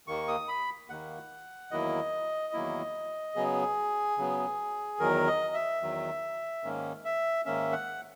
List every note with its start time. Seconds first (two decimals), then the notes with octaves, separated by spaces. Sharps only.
0.07 D#2 D#3 A#3 C#6
0.28 D#6
0.48 B5
0.90 D#2 D#3 A#3 F#5
1.71 E2 D#3 F#3 A#3 E4 D#5
2.53 E2 D#3 F#3 A#3 E4
3.36 C#3 F#3 B3 G#4
4.18 C#3 F#3 B3
4.99 E2 D#3 F#3 A#4
5.27 D#5
5.54 E5
5.82 E2 D#3 F#3
6.63 G#2 D#3 A#3 C#4
7.05 E5
7.45 G#2 D#3 A#3 C#4 E5
7.72 F#5